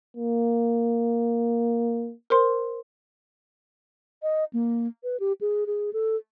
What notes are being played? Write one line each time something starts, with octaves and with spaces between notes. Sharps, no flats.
A#3
A#4 C5 C6
D#5
A#3
B4
G4
G#4
G#4
A4